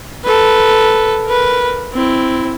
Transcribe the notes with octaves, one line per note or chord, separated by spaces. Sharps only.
A4 B4
A#4 B4
C4 E4